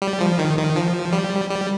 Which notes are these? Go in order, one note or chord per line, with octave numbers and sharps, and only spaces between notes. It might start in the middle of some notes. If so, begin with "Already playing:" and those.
G3
F3
D#3
D#3
F3
G3
G3